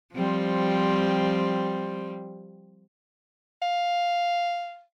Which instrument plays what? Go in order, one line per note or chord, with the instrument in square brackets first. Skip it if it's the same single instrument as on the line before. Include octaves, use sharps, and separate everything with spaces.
[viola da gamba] F3 G3 C4
[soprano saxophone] F5